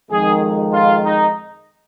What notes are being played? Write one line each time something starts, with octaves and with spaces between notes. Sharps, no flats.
F2 D#3 G#3 G#4
F4
D#4